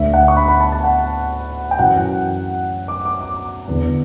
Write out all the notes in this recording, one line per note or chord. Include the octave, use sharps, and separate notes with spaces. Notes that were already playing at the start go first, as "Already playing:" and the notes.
Already playing: D2 D3 E5
F#5
C#6
B5
B5
A5
A5
F#5
G5
F#2 E3 F#5
D6
D6
D6
E2 D3